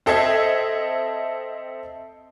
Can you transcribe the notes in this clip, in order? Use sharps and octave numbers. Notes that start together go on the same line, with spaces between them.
C4 A4 D#5 E5 G#6 C7